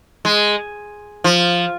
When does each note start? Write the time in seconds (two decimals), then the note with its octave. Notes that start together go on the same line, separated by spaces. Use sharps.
0.25 G#3
1.24 F3